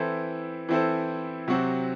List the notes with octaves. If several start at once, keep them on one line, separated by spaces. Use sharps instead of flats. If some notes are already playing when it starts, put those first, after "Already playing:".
Already playing: E3 C4 E4 A4 C5
E3 C4 E4 A4 C5
C3 F#3 C4 F#4